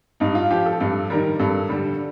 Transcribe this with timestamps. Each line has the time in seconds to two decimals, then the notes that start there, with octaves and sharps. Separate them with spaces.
0.20 G2 D#4
0.35 F4
0.50 F3 G4
0.66 A4
0.80 G2 A4
1.10 D#3 G3 A#4
1.39 G2 A4
1.69 D3 G3